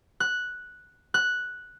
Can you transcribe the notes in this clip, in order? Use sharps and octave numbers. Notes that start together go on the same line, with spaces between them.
F#6
F#6